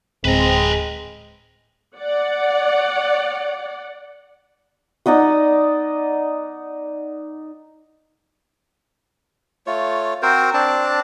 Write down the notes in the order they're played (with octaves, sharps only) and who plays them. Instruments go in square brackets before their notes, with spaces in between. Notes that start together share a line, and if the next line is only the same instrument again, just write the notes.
[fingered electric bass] D1 [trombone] G#3 [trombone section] C4 [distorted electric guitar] B4 A#5
[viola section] D5 F#5
[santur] D#4 D5 D#5 F#5
[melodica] A3 F4 C#5
C4 F#4 A#4 C5
C4 D4 A5